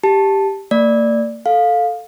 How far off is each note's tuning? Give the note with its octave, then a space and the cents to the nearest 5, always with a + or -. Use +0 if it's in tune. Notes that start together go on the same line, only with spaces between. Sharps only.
G4 +0 A5 +0
A#3 -35 D5 +0
A4 +0 F5 +15